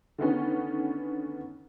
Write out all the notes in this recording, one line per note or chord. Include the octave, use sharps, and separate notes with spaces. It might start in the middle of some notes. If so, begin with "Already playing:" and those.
D3 D#3 B3 C#4